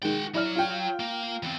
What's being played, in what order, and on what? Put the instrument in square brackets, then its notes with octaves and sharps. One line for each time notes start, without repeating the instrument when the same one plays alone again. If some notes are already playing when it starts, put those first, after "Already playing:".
[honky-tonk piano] D#3 G#3 [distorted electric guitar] F#4 G5
[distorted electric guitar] F#3 [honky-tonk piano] E4 D5 F6
[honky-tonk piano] F4 G5
[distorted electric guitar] A#3
E2 C4